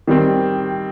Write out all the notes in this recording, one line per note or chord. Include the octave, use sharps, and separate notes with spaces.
D#3 G3 C4